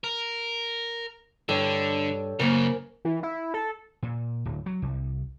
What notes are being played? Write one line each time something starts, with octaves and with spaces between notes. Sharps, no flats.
A#4
G2 D3 A4 C#5
F#2 C#3 A#3 A#4 C5 G#5
E3
E4
A4
A#2
D1
F#3
C2